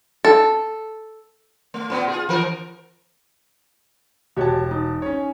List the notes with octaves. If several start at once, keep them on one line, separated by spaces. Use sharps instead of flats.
A4
A3
A#2 B3
F4 G#4
E3 A#4
E1 F#4 G4 C#5 A5
D#4
C#4 C#5